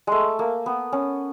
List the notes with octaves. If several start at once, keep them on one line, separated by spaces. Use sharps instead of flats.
G#3 A3
A#3
B3
C#4